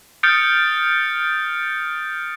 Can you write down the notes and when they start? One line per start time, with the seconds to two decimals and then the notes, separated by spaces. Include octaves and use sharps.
0.23 D#6 F6 G6 A6 C#7 D7